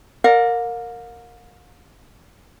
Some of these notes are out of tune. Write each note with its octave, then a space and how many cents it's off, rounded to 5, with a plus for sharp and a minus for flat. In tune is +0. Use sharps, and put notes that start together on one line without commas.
A#4 -10 D5 +0 F5 +45